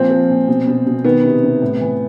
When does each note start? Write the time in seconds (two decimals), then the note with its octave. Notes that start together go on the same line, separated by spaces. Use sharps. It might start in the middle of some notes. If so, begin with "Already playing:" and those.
Already playing: A#2 F3 C4
0.10 F3
0.30 A#2
0.48 B2
0.67 B2
0.86 B2
1.04 D#3 B3
1.24 C3
1.43 C3
1.62 A2
1.80 E3